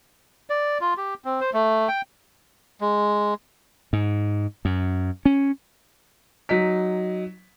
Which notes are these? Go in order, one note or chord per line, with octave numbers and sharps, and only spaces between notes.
D5
F4
G4
C4
C5
A3
G5
G#3
G#2
F#2
C#4
F#3 D#4 B6